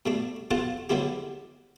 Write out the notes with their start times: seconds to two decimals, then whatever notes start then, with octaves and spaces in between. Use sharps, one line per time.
0.06 B2 A3 D4
0.51 B2 F4 A4 F#5 A5
0.90 D3 F#3 G#3 B3 E4 G4